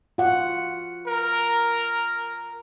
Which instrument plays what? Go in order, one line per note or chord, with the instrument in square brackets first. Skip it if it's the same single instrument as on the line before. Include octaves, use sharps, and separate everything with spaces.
[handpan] F4 F#5
[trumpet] A#4